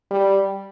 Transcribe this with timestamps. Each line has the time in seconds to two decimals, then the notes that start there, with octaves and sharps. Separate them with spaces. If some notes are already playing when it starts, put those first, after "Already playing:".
0.11 G3